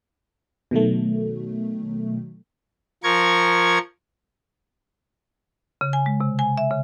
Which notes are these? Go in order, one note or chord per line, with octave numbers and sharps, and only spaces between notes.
B2 D#3 F#3 A3
F3 A#4 C#6 G#6
C#3
G#5
G#3
C3
G#5
E5
C#3